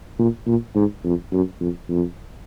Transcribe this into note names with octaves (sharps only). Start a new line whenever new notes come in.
A#2
A#2
G#2
F2
F#2
F2
F2